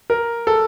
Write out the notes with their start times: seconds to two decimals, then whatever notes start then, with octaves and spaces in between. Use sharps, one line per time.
0.10 A#4
0.47 A4